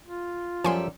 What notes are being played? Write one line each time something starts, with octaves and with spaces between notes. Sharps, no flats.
F4
F#2 F3 G3 A4 G#5 C6